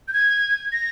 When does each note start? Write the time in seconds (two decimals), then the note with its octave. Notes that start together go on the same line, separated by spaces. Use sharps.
0.08 G6
0.13 G#6
0.72 A#6